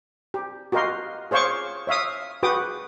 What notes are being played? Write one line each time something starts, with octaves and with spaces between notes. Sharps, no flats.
G4
F#4 G4 A#4 D#5 F5 C6
G#4 C5 C#5 F5 C#6 D6
C#5 E5 F5 D#6
F#4 G#4 B4 G5 D6 D#6